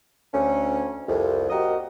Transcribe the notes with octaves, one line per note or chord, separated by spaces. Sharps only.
D2 C#4
C2 F2
A#3 F#4 G4 A#4 D#5